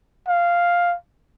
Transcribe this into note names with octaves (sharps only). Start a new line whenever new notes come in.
F5